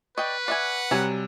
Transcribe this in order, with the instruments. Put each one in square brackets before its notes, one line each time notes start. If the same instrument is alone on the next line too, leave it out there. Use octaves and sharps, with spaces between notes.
[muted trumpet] B4 [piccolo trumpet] D5 [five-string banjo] D#5 G5 [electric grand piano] C#6
[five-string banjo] D5 E5 G#5 [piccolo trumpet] F#5
[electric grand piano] C3 G3 [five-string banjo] F#3 G#5 A#5